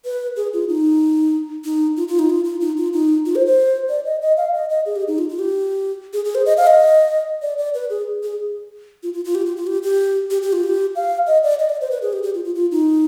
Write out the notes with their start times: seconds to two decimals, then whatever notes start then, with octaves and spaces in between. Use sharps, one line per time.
0.05 B4
0.36 G#4
0.53 F4
0.69 D#4
1.64 D#4
1.97 F4
2.08 F4
2.19 D#4
2.30 F4
2.44 F4
2.60 D#4
2.77 F4
2.93 D#4
3.26 F4
3.35 C5
3.46 C5
3.89 D5
4.05 D#5
4.21 D#5
4.37 F5
4.54 D#5
4.70 D#5
4.86 G#4
4.96 G4
5.08 D#4
5.18 F4
5.29 F4
5.39 G4
6.13 G#4
6.25 G#4
6.35 C5
6.46 D#5
6.57 F5
6.67 D#5
7.42 D5
7.58 D5
7.74 B4
7.90 G#4
8.23 G#4
9.03 F4
9.13 F4
9.25 F4
9.35 G4
9.46 F4
9.57 F4
9.67 G4
9.83 G4
10.31 G4
10.42 G4
10.53 F4
10.63 G4
10.96 F5
11.27 D#5
11.43 D5
11.59 D#5
11.69 D5
11.81 C5
11.91 B4
12.02 G#4
12.13 G4
12.23 G4
12.34 F4
12.44 F4
12.55 F4
12.71 D#4